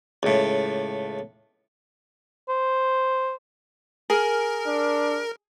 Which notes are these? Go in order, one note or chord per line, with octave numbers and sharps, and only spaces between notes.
C#2 A2
C5
G#4 A#4
D4